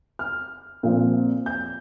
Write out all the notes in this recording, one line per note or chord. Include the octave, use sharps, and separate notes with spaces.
F6
A#2 F3 C4
G6